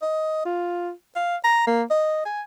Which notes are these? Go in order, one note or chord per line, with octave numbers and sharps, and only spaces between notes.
D#5
F4
F5
A#5
A#3
D#5
G#5